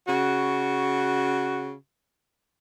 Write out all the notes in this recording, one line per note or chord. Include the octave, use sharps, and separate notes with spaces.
C#3 F#4